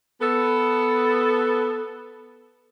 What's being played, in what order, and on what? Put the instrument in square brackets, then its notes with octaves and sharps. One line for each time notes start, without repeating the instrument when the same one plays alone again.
[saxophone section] B3 A4